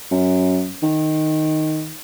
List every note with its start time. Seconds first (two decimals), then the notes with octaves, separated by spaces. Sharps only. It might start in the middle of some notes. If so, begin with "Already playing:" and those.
0.11 F#2
0.83 D#3